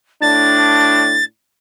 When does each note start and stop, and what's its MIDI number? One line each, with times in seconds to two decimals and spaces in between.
0.22 1.23 45
0.22 1.23 62
0.22 1.24 93